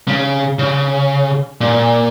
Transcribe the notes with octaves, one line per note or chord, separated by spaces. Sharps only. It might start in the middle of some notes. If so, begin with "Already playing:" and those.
C#3
C#3
A#2